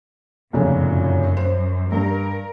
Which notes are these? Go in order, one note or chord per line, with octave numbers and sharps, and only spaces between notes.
F1 F#2 A#2 C#3
C5
G2 A#4